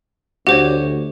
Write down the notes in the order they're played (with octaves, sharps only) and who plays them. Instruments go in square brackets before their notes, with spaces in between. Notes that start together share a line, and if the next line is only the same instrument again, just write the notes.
[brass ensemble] D2 [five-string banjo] F#4 [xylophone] G4 C5 C#5